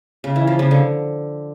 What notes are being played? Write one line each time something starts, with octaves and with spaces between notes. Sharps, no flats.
C#3
E3
F3
C#3
D3